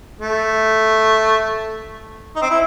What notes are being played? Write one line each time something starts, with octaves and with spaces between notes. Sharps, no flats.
A3
D#4
C4
E4